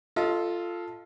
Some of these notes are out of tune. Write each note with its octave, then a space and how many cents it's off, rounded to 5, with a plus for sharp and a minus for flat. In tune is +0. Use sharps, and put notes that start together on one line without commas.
F4 -5 A4 +0 D#5 +30